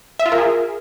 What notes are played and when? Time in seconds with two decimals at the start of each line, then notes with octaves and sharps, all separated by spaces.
0.19 E5
0.26 F4
0.32 A#4
0.38 G#4